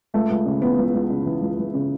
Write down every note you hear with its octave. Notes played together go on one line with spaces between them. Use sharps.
C#2 A3
C#2
C#3
E3 B3
C#2
C#2
C#3
E3
C#2
C#2
C#3